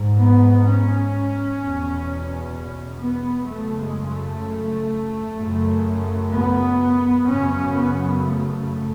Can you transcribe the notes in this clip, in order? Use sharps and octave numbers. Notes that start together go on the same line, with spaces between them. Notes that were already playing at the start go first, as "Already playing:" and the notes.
Already playing: G#2
B3
C#4
E2 B2
B3
F#2 C#3 A3
G#3
A3
F#2 C#3
B3
F#2 C#3 C#4
B3
A3